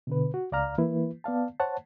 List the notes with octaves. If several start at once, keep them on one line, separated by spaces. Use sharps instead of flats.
B2 D3 B4
F#4
C#2 D5 F5 A#5 F6
E3 A#3 E4 B4
B3 D5 F5 A5
C5 C#5 F#5 A5